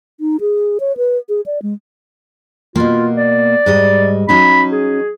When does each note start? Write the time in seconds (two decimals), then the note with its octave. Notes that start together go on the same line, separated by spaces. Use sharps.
0.20 D#4
0.41 G#4
0.80 C#5
0.97 B4
1.29 G#4
1.46 D5
1.62 G#3
2.76 B2 A#3 F4
3.17 D5
3.66 G#2 G3 D#5
4.29 F#3 C#4 D#4 B5
4.72 G#4